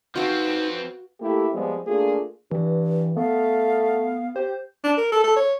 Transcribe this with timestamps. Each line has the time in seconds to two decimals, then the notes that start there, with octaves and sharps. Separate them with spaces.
0.16 F3 C4 D#4 F#4 B4 F5
1.20 A3 A#3 E4 G4
1.53 F3 G3 G#3 B3 C4
1.87 A3 A#3 D4 F4 G#4
2.51 G2 E3
3.17 A3 B3 F5
4.36 G4 C5
4.84 D4
4.97 A#4
5.12 A4
5.24 A4
5.36 C#5